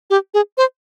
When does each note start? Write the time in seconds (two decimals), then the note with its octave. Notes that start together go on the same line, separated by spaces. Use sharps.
0.10 G4
0.34 G#4
0.57 C5